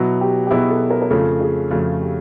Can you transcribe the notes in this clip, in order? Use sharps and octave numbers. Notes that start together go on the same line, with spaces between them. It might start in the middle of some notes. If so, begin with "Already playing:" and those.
Already playing: B2 F#3 B3 E4 F#4
G4
G4
B2 F#3 B3 E4 G#4
A4
A#4
A#4
F2 C#3 F3 A3 A4
G#4
F2 C#3 F3 A3 F#4
G4